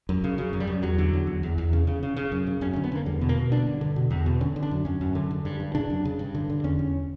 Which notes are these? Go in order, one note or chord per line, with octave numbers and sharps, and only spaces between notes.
F#2
C#3
C#3 F#3
F#2
G3
F#2
E2 F#3
D3
E2
E2
E2
E2
C#3
C#3
C#3
C#3
F#2
C#3
F#2 C#4
C#4
D3
B3
D3 A#3
E2 G3
B2
A#3
B2
D3 D4
G2
D3
B2
E2
B2
D3 C#4
D3
D4
F#2
F#2 C#4
F#2
D3
D3
G2
G2
C#3 D4
F#2
C#3
G2
D3
D3
E2 C#4
E2